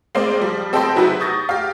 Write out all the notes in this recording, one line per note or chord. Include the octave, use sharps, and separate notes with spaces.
G#3 A#3 C4 C5 D5
F3 G3
C4 A4 D#5 G5 B5 C6
C3 F#3 E4 F#4 G#4 B4
C#6 D#6 G6 A6 A#6
G4 F5